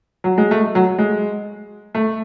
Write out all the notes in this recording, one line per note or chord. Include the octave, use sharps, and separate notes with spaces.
F#3
G#3
A3
F#3
G#3
A3